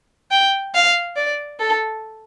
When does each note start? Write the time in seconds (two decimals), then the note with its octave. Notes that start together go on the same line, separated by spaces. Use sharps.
0.31 G5
0.74 F5
1.16 D5
1.60 A4